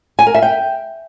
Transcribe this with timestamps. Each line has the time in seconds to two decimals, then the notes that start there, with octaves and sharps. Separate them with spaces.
0.19 G#5
0.27 A#4
0.34 E5
0.42 G5